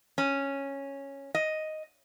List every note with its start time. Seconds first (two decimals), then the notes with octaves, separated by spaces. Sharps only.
0.18 C#4
1.34 D#5